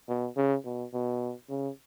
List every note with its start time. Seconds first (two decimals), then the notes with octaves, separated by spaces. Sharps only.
0.08 B2
0.37 C#3
0.65 B2
0.93 B2
1.49 C#3